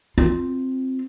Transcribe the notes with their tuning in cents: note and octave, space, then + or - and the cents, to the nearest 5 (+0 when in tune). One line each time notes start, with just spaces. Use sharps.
C4 +0 F4 +0